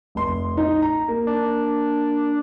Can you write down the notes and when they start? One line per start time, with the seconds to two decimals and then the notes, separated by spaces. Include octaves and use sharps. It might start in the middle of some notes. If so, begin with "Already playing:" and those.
0.15 F1 C6
0.57 D#4
0.82 A#5
1.08 A#3
1.27 D4